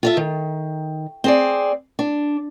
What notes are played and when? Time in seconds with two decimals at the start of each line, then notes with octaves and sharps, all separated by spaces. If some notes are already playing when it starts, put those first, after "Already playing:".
0.03 F4 A4 E5
0.17 D#3
1.24 C4 G#4 D5
1.99 D4